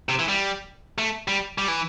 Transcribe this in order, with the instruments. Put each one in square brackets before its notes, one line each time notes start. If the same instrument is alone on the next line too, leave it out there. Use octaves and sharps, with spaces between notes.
[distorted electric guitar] C3
E3
G3
A3
G3
G3
E3